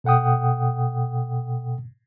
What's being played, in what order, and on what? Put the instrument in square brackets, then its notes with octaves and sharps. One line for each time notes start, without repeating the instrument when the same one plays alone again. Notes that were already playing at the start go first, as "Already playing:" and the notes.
[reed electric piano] B2 A4 F#5 G5 D#6